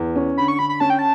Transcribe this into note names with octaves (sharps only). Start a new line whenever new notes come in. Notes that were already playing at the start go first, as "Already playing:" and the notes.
Already playing: E2
C#4
D3 B5
C#6
D3 B5
B5
C#4 A5
G5
A5